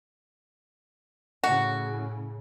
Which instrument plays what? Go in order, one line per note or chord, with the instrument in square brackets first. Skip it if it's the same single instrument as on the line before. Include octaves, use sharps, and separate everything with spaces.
[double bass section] A2 C#3 [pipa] F#4